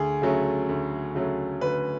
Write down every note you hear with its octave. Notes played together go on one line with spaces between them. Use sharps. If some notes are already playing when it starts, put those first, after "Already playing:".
Already playing: D2 G#4
C#3 F#3 A3
D2
C#3 F#3 A3
D2 B4